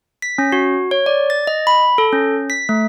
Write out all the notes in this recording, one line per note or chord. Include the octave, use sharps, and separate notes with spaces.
B6
C#4
F#4
C#5
D5
A6
D#5
B5
A4
C#4
B6
A3